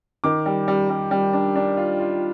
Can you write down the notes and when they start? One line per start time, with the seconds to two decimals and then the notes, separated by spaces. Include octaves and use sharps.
0.24 D#3 D6
0.46 G3
0.68 G3
0.90 G3
1.11 G3
1.33 D4
1.56 D4
1.77 F4
2.00 F4